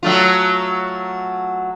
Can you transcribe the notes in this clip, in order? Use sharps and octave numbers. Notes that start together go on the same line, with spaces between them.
F#3 A3 F4